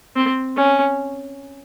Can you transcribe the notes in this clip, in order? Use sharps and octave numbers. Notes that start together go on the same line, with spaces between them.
C4
C#4